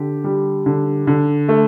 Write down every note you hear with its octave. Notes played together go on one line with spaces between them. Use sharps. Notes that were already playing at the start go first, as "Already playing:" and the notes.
Already playing: D3 G4
G3
D3
D3
A3